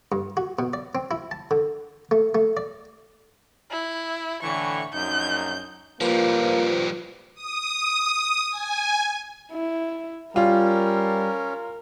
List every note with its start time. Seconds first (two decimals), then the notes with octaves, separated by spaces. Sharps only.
0.12 G2
0.37 F#4
0.59 B2
0.73 D5
0.95 C4
1.11 E4
1.31 A5
1.51 D3
2.11 A3
2.35 A3
2.57 D5
3.71 E4
4.43 A2 D3 E3 C#6
4.93 A#1 F#2 D#4 G6
6.01 F3 G3 A#3 F4 B4 C5
7.34 D#6
8.50 G#5
9.52 E4
10.36 G3 C#4 F4 A#4